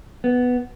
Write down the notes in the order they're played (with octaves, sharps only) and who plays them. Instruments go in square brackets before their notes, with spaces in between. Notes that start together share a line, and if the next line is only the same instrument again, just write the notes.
[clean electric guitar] B3